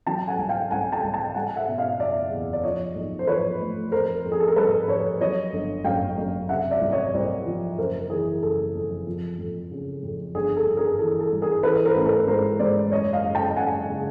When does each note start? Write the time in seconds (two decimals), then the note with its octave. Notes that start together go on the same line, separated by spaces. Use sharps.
0.06 F#3 G5 A5
0.27 F#5 G#5
0.38 C2
0.49 F5 G5
0.71 C2 F#5 G#5
0.92 G5 A5
1.03 C2
1.14 G5 A5
1.35 G3 F#5 G#5
1.56 E5 F#5
1.67 B2
1.78 D#5 F5
1.99 F#1 D5 E5
2.31 E2
2.53 D5
2.63 F3 C#5 D#5
2.95 B1
3.19 C5
3.27 F3 B4 C#5
3.60 A2
3.92 F2 A#4 C5
4.25 F2
4.32 G#4
4.40 A4
4.48 A#4
4.56 G3 A4 B4
4.88 F2 B4 C#5
5.21 F#3 C#5 D#5
5.53 G1
5.84 F#2 F5 G5
6.18 F#2
6.49 C3 E5 F#5
6.71 D5 E5
6.81 C2
6.92 C#5 D#5
7.14 C2 C5 D5
7.46 F3
7.78 F#1 A#4 C5
8.09 E3 G#4 A#4
8.43 F#1 A4
8.75 F2
9.07 F3
9.39 F2
9.71 C#3
10.03 F2
10.35 G1 G#4
10.57 A4
10.67 G1
10.77 G#4 A#4
10.99 E3 A4
11.21 A4
11.31 G2
11.42 G#4 A#4
11.63 E3 A4 B4
11.85 A#4 C5
11.95 A1 A#4
12.06 A4 B4
12.27 G#2 A#4 C5
12.59 G#2 C5 D5
12.92 F#1 C#5 D#5
13.13 D#5 F5
13.24 F#1
13.35 G5 A5
13.56 F#1 F#5 G#5
13.89 C#3